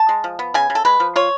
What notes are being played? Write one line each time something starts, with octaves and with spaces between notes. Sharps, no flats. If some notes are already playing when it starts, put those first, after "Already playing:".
Already playing: A5
G#3
F3
B3
C#3 G#5
C#3
A4
G#3 B4
F3
F4 C#5